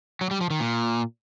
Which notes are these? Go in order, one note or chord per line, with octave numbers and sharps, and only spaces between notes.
F#3
G3
F3
D#3
A#2